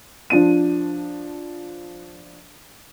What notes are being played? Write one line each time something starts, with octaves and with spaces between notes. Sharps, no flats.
F3 D4 D#7